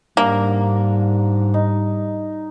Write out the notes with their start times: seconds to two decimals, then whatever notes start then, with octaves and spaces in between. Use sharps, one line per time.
0.17 G#2 G3 A#3 D4 A#5
1.54 D#4